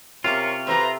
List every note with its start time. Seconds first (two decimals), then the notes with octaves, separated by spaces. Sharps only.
0.24 C3 C#4 F4 A#4 A5 C#6 D6
0.67 G4 A4 B4 C5 E5 A#5